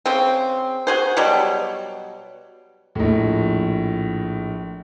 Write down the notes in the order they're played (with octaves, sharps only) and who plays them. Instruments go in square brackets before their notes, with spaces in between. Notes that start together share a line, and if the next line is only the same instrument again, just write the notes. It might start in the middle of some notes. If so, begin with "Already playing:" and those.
[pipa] C#3 C4
F#4 G#4 C5
B2 F#3 G3
[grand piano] A#1 A2